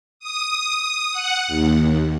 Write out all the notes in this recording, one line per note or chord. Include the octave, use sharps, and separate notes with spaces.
D#6
F#5
D#2